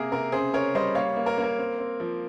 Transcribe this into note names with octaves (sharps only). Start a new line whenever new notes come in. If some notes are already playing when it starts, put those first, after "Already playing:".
Already playing: C3 A#3 G#4 A#4
C3 A#4
C#3 G#4 C5
C#3 A#4 C#5
G3 C5 D#5
A#3 C#5 F5
A#3
A#4
A#3
A#4
C4
C4
F3